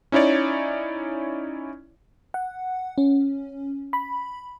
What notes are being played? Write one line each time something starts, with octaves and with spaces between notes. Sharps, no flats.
C#4 D#4 E4 C#5 D5
F#5
C#4
B5